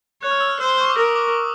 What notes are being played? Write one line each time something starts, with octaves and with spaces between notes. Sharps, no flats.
C#5 F#6
F6
E6
F6
C5 E6
C#6
D6
A#4 D#6
D6